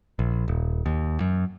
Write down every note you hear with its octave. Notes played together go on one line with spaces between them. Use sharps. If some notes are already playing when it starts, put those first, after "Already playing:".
A#1
D#1
D#2
F#2